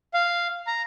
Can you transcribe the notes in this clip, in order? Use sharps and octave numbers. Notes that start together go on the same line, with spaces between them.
F5
A#5